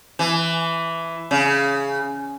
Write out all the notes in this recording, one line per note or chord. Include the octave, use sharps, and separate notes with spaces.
E3
C#3